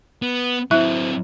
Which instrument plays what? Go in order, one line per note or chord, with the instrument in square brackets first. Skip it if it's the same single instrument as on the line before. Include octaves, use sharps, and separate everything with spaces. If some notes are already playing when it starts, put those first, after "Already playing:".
[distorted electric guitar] B3
[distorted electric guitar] F#3 C4 [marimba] E4 E5 F#6